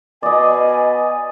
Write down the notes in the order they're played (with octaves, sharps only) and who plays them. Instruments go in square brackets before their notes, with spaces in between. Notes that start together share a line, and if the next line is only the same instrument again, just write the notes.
[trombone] B2 [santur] D5 D#5 [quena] G#5